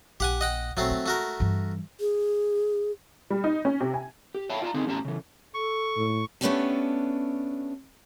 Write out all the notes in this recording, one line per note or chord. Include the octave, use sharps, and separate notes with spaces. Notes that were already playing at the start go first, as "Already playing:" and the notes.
A#1 G4 F#5 G#5
D#5 F#5 G5
A#1 F#3 A3 C4
G#3
A3 F#4 A#4
G2 E3
G#4
G3
D#4
C#4
C3
G#5
G4
C#5 E5 F5 G5 A5 B5
E4 F4 D5 E5 A5 A#5
D3 D#3 C4 D4 D#4 G#4
E2 A2 C#4 G4 A5 A#5
C#3 E3
A4 C#6
A2
A3 B3 C#4 D4 G4 A4